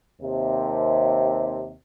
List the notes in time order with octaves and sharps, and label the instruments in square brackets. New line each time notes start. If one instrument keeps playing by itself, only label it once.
[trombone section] D#2 C3